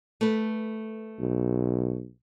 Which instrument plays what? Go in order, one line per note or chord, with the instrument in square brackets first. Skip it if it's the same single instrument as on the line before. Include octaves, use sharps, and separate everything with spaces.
[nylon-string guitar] A3 B4
[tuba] B1